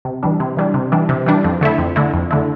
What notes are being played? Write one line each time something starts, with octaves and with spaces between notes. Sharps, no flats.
C3
E3 G3 D4
C3
E3 G3 D4
C3
E3 G3 D4
C3
E3 G3 D4
F2
D3 A3 E4
F2
D3 A3 E4
F2
D3 A3 E4